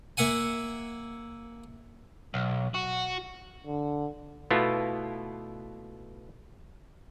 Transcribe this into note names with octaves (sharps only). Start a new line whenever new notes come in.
A#3 E5 F#5 G#5
B1
F#4
D3
B2 A3 B3 E4 F4